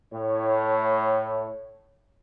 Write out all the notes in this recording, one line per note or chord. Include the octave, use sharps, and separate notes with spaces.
A2 C#5